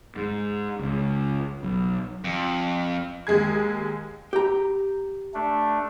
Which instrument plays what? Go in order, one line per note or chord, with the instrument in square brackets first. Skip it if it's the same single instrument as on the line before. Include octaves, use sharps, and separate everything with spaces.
[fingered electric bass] G#2
C#2
B1
[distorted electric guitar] F2
[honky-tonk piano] D#2 G#3 G#4 G#6
[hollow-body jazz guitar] G4 A#5
[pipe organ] A3 D4